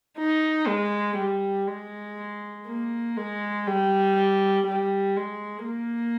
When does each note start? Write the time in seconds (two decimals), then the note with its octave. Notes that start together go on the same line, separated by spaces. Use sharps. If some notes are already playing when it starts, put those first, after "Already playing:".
0.18 D#4
0.67 G#3
1.17 G3
1.67 G#3
2.67 A#3
3.17 G#3
3.67 G3
4.67 G3
5.16 G#3
5.67 A#3